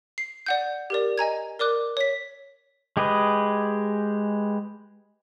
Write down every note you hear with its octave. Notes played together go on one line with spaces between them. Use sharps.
C7
D5 F#5 G6
G4 A#4 D5
D#5 G#5 A#5 G#6
A#4 D5 D6 F#6
C#5 B6
G#3 G4 G#4 B4 D#5